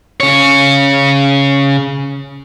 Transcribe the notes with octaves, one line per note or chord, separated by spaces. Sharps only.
C#3 C#5